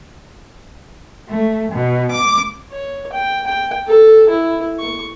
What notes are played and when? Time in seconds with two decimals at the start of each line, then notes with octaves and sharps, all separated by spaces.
1.29 A3
1.71 B2
2.11 D6
2.72 C#5
3.13 G5
3.47 G5
3.88 A4
4.29 E4
4.79 C#6